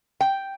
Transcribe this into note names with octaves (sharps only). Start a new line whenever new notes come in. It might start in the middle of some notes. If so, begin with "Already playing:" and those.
G5